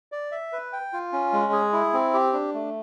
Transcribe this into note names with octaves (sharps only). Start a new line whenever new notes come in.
D5
E5
B4
G5
F4
C#4
G#3
G#4
E4
C4
G4
D4
A3